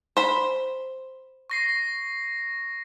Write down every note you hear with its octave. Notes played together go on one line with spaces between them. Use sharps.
C5 B5
C#6 A#6 C7